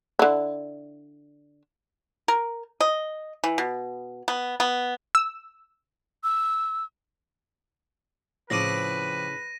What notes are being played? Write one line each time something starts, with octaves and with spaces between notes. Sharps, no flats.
D3 E4
A#4
D#5
E3
B2
B3
B3
E6
E6
A2 C#3 F3 C4 B4 D5 A#6 D#7